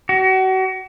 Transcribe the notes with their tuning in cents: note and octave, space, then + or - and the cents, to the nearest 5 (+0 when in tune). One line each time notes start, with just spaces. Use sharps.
F#4 +35